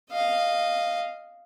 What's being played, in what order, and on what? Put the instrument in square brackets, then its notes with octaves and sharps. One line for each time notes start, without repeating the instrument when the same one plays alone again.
[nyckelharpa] D#5 F5